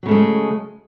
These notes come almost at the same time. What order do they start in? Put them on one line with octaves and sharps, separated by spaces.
F#3 C#3 A3 G#3